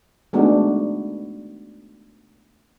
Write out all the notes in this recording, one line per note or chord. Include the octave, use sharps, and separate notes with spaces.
G#3 A3 B3 D4 D#4 F#4